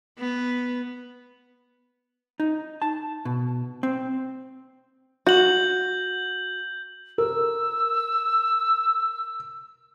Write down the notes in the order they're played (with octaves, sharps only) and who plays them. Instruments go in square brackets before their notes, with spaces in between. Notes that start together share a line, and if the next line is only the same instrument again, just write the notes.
[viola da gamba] B3
[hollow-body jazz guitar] D#4
A5
B2
C4
[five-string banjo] F#4 [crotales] G6 F#7
[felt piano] A#4 [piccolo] E6